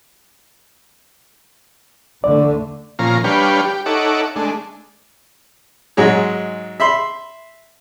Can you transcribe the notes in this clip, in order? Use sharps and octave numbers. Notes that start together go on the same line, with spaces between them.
E2 D3 A3 D5
A#2 F3 C#4 F5 A#5
G3 D4 B4 C#5 F5 G5
G4
D#4 A4 C#5 E5 F#5 D6
G#3 A3 D4
G#2 F#3 G#3 G#4
E5 B5 C6